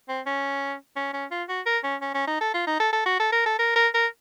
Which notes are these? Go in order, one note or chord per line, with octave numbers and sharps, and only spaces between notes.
C4
C#4
C#4
C#4
F4
F#4
A#4
C#4
C#4
C#4
D#4
A4
F4
D#4
A4
A4
F#4
A4
A#4
A4
A#4
A#4
A#4